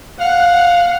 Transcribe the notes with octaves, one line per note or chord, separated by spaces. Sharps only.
F5 F#5